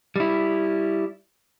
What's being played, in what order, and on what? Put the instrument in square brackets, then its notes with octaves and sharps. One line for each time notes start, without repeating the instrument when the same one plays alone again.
[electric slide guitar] G3 E4